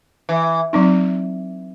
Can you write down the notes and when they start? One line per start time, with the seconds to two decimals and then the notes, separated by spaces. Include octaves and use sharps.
0.29 E3
0.73 F#3 C4 D#4